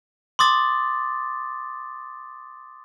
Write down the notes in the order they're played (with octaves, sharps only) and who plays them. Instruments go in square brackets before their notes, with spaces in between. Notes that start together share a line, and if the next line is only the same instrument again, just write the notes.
[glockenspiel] C6 D6 D#6 A6